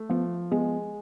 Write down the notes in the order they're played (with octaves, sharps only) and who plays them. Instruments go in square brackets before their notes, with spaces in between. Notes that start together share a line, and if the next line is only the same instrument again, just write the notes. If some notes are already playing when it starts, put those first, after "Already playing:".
Already playing: [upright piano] A3
[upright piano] F3 [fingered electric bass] B3
[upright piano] G#3 [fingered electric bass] B3